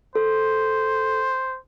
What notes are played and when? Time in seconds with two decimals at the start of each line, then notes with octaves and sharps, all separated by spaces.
0.15 A4 C5